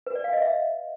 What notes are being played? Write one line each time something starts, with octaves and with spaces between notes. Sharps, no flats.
B4
D5
F5
D#5
E5